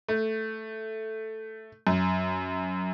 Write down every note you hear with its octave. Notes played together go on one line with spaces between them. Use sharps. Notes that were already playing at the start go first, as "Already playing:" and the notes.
A3
F#2